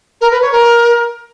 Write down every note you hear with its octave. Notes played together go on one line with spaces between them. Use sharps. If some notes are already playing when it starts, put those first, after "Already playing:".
A#4
B4
C#5
A#4